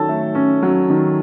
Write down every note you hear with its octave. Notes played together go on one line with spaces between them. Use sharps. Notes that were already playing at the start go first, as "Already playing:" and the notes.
Already playing: D#3 F#3 A4 C#5 A5
A3
C#4
F#3
D#3